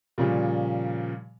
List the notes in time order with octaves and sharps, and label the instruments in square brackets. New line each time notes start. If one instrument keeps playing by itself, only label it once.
[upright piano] A#2 C#3 F3 G3